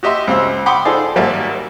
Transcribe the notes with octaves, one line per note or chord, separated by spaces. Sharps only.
F#4 G4 D#5 E5 C6
C#2 C4 F5 E6
F#5 G5 B5 C6 D6 D#6
D#4 F4 G#4 A4 C5 D5
G#1 F#3 G3 A#3 D5 E5